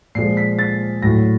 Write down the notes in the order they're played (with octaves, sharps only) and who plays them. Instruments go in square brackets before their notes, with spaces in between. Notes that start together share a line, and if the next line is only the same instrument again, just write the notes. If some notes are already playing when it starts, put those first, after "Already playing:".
[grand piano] A#2 F3 G#3 C7
B6
A6
A2 F#3 A#6